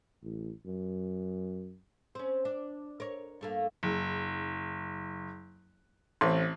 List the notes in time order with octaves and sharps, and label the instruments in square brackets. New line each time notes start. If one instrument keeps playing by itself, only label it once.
[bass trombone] A1
F#2
[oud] C4 C#4
D4
A#4 C#5
G2 A3 A#3
[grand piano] F#1
[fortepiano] A1 C4 [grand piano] C6